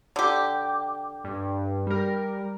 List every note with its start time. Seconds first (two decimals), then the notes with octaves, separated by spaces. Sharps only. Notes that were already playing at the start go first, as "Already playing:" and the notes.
0.16 D3 G4
1.24 G2
1.87 G3 A#4